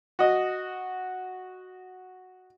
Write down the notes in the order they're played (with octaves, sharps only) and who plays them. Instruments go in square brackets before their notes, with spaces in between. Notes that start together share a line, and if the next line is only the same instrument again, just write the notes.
[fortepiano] F#4 D#5